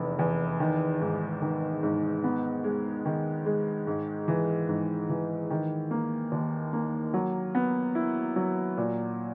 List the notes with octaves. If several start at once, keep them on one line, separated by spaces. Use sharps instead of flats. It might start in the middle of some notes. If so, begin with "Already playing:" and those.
Already playing: F1 E2
E2
D#3
G#2
D#3
G#2
B3
G#3
D#3
G#3
G#2
E3
G#2
E3
D#3
A#3
D#2
A#3
F#3
B3
E4
F#3
A#2